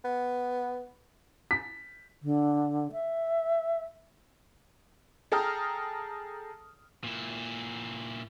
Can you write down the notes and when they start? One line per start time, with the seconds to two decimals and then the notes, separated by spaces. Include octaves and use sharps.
0.04 B3
1.51 B6
2.22 D3
2.92 E5
5.32 G#4 A4 G5 A#5 D#6 F6
7.04 A#2 E4